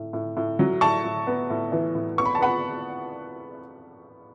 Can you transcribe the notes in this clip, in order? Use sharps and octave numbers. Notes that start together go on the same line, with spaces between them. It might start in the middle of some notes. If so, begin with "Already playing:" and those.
Already playing: A2
A2
A2
F#3
A2 A5 C#6
A2
B3
A2
E3
A2
B3 C#6
B5
A5
B3 F#5 B5